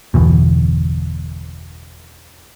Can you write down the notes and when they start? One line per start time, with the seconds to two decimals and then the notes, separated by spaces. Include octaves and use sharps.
0.14 G1 E2 B2